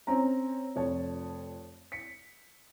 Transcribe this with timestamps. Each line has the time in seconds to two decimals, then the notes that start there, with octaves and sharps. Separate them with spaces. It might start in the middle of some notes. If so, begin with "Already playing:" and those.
0.07 C4 C#4 A#5
0.76 F1 F2 C#5 A5
1.92 B6 C#7